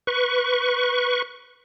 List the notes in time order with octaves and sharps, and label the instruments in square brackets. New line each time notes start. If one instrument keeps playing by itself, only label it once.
[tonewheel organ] B4 C#6